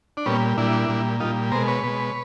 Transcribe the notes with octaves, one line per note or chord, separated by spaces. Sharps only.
D4
A#2 G3 B3 C#4
A#2 G3 D4 E4
A#2 G3
A#2 G3 D#4 F4
B2 G#3 A#4 C5
B4 C#5
B2 G#3